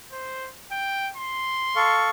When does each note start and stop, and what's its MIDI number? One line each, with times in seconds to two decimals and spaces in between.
0.12 0.49 72
0.71 1.09 79
1.16 2.08 84
1.76 2.10 69
1.76 2.10 77
1.76 2.10 85